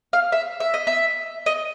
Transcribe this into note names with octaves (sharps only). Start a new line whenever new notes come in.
F5
E5
E5
D#5
E5
D#5